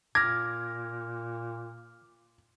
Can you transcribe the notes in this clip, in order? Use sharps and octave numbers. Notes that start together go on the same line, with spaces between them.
A#2 D6 F6 G#6 A#6